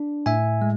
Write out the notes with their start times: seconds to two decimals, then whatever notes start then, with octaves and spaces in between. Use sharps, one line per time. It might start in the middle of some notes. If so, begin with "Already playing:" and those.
Already playing: D4
0.26 A2 E5 G#5
0.62 G#3